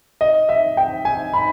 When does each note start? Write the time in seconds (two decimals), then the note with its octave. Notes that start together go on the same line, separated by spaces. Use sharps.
0.21 D#5
0.49 E5
0.77 G5
1.05 G#5
1.33 B5